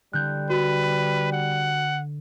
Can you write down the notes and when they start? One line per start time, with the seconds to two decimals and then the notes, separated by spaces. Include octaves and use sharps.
0.13 D3 G3 F#6 G6
0.50 F#4 B4
1.32 F#5